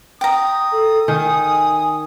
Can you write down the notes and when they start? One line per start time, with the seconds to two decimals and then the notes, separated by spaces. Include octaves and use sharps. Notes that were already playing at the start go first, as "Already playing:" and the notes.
0.21 G5 A#5 D#6
0.72 A4
1.08 D#3 G#5